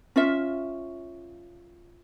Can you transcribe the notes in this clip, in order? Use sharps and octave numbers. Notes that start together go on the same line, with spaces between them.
C#4 F4 E5